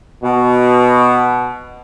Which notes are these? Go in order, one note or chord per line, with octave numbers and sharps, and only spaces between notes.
B2